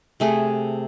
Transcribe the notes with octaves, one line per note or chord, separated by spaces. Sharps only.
C3 A3 G#4